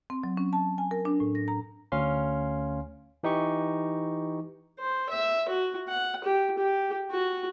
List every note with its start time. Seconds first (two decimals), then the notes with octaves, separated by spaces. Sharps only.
0.10 C4
0.24 F#3
0.37 C#4
0.53 A5
0.78 G#5
0.91 A#4
1.05 D4
1.20 A2
1.35 A#6
1.48 A#5
1.92 D2 C#4 F5 C6
3.23 E3 D#4 G4 C#6
4.79 C5
5.09 E5
5.49 F#4
5.88 F#5
6.24 G4
6.58 G4
7.11 F#4